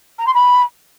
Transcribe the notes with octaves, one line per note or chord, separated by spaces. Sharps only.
A#5
C6
B5